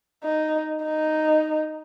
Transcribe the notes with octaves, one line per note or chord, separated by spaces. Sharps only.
D#4
D#4